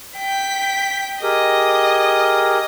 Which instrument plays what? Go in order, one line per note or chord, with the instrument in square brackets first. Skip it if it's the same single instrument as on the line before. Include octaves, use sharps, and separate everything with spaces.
[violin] G5 B6
[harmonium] G4 G#4 A#4 [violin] D#5